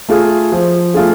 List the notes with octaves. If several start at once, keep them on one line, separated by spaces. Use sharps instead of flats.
A3 F4 G#4
F3
A3 F4 G#4